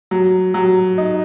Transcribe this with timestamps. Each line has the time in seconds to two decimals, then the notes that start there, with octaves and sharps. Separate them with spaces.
0.11 F#3
0.54 F#3
0.98 D#4